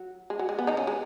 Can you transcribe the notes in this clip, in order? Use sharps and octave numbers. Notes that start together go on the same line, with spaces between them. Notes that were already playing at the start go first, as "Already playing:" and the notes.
Already playing: F#3
G#3
F#3
G#3
B3
D#3 D#4
C#3 C#4
G#3